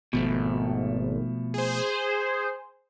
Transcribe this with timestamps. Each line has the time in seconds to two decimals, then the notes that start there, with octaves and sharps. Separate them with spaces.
0.13 G#1 B2 F3 A3
1.54 G#4 C5